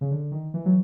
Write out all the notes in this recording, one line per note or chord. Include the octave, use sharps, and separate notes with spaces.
C#3
D3
D#3
E3
F#3